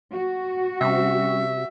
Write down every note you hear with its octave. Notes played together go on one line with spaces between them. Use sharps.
F#4
C3 G3 C#4 E5